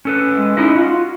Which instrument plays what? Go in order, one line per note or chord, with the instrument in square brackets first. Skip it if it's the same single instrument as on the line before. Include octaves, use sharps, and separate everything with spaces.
[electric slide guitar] C#4 A4 B4
[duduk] G#3
[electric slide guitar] C#4 E4 D#5 [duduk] D#4
[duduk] F4 [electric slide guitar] F#4